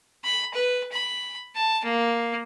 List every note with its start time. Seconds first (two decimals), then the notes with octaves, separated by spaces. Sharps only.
0.24 B5
0.54 B4
0.92 B5
1.56 A5
1.84 A#3